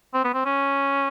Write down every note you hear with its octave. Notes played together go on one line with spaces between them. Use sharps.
C4
B3
C4
C#4